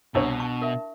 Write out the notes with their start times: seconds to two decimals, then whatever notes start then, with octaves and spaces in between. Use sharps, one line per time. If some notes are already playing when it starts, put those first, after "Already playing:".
0.15 C2 B2 D4 E4 C#5 E6
0.40 A5 C#6
0.62 A#4 E5